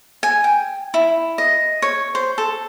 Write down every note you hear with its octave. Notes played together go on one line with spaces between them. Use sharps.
G#5
G5
E4
D#5
C#5
C5
A4